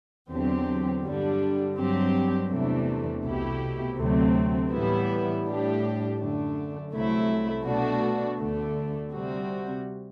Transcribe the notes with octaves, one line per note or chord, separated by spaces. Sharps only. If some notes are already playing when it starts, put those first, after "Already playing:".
E2 D3 F#3 C4 G4
G2 D3 G3 D4
G2 F#3 C4 G4
E2 C3 E3 A3 D4
C2 B2 A3 E4 G4
D2 C3 F#3 A3 C4
A2 E3 G3 B3 E4
A2 G3 D4 G4
F#2 D3 A3 D4
C2 C3 F#3 A3 E4
B2 A3 D4 F#4
D2 D3 A3 D4
C3 G3 C4 F#4